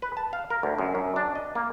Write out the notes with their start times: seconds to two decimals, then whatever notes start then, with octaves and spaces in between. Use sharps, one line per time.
0.02 B4
0.17 A5
0.33 F5
0.50 A#4
0.63 D2
0.78 F#2
0.95 F#2
1.16 D4
1.35 D#5
1.55 A#3